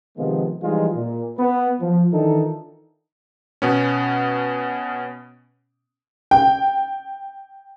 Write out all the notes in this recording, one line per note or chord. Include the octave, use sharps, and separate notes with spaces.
C3 D#3 F3 G#3 B3 F4
E3 F3 G3 G#3 D#4 F4
A#2
B3 B4
F3
D#3 E3 D4 D#4 F4 A4
B2 B3 C#4
G5